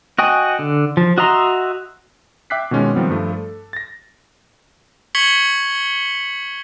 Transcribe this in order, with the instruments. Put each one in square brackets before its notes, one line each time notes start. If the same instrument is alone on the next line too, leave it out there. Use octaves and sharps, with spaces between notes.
[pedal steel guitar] F#4 D#5 G5 G#5
D3
F3
F#4 D#5 E5 A#5 C6
[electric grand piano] E5 G5 D6 F#6 B6 C7
B2 D#3 G#3 C#4 F4
D#3 F3 G3 B3 C4
G2 F3 A3
A4
A6 A#6
[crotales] C#6 G#6 B6 C#7 F#7 G7